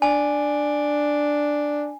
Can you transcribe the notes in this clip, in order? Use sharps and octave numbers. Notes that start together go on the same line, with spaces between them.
D4 G#5